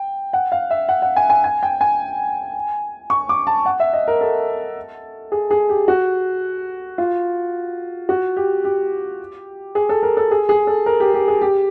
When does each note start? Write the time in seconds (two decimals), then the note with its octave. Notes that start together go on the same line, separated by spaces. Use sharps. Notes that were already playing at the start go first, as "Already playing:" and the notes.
Already playing: G5
0.33 F#5
0.52 F5
0.70 E5
0.89 F#5
1.02 F#5
1.16 G#5
1.30 G#5
1.44 G#5
1.63 G5
1.81 G#5
3.10 C#6
3.29 D6
3.47 A5
3.66 F#5
3.80 E5
3.93 D#5
4.08 A#4
4.21 A4
5.32 G#4
5.51 G#4
5.69 G4
5.88 F#4
6.98 F4
8.09 F#4
8.37 G4
8.64 G4
9.75 G#4
9.89 A4
10.03 A#4
10.17 A4
10.31 G#4
10.49 G#4
10.67 A4
10.86 A#4
11.00 G4
11.14 G4
11.28 G#4
11.41 G4